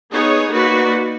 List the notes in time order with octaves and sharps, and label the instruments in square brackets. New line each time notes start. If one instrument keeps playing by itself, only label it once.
[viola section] B3 D#4 G#4 C#5
A#3 D#4 F#4 B4 D5